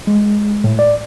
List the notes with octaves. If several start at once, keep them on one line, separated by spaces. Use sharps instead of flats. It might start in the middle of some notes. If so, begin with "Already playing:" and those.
G#3
A2
D5